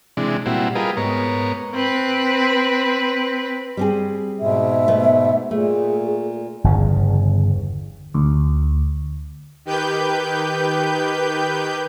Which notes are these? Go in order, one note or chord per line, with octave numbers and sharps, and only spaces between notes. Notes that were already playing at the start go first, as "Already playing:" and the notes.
C3 E3 G#3 D4
A#2 G3 C4 E4 F#4
G3 F4 G#4 A#4 B4 D#5
G#2 B3 A#4 C#5
C4 B4
G3 C4 G#4
G#2 B2 E5
A3 B3
A#2 A3 G#4
G1 E2 C#3
D2
D#3 G4 B4 G6